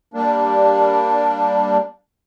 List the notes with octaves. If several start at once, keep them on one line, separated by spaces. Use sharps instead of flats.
G3 A#3 D4